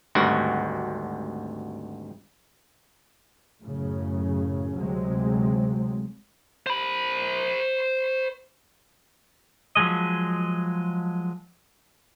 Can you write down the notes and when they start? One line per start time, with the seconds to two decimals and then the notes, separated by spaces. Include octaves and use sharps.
0.15 G#1 D2 G2 F#4
3.60 F#2 A2 C#3
4.78 D2 C3 F#3 G#3 C4
6.66 C5 B5
9.75 F3 F#3 G#3 D#5